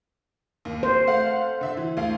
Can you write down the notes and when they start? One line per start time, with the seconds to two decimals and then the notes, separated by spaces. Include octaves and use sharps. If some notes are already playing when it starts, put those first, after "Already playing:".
0.65 D#2
0.83 C5
1.07 A3 F5 F#5
1.61 D3 E5 C6
1.77 E3
1.97 D2 F5